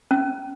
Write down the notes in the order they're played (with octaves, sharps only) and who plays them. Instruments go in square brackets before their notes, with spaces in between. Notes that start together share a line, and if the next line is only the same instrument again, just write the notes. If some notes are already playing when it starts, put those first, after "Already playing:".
[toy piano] C#4